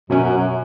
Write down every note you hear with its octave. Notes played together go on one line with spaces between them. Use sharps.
F#2 B2 F#3 C#4
F#2
F#2